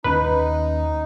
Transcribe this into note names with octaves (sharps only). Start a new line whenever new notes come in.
D#2 C#4 D#4 B4